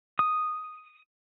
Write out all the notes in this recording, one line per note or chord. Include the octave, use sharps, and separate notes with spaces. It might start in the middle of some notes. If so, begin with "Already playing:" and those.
D#6